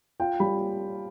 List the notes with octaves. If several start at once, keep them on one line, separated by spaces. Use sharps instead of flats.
F4 G5
G3 B5